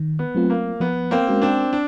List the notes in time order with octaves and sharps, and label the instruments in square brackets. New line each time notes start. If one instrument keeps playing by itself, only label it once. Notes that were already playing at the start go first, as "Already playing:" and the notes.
Already playing: [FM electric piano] D#3
[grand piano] B3
[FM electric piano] F#3 A3 C4 F4
[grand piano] A#3
[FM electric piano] F3 [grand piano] B3
[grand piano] A#3 C4
[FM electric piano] G#3 C#4 F#4 A#4
[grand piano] C4 D4
D4